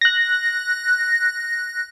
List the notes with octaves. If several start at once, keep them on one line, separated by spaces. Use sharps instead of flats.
F#6 A#6